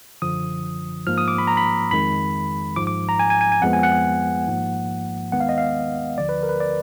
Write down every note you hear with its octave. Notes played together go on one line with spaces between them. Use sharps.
G#1 F#2 D3 F3 D#6
G#2 F3 A#3 F6
D#6
D6
B5
A#5
B5
F2 D#3 G#3 B5
G#1 G#2 F3 D6
D6
A#5
G#5
G#5
G#5
G#5
F2 F3 G#3 B3 F#5
G#5
F#5
G#1 G#2 F3 A#3
D#2 D#3 G#3 B3 F#5
F5
D#5
F5
D2 D3 F3 D5
B4
A#4
B4
D5